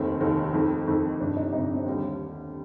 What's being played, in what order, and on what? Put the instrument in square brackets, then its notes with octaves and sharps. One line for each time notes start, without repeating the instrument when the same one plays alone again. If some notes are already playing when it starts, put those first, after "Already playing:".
Already playing: [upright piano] F1 D#2 D#3 A3 C4
F1 D#2 D#3 A3
F2 D#3 A3
F2 D#3 A3
G1 F2 C3 D4
D#4
G1 F2 C3 D#4
D4
C4
D#2 D3 G3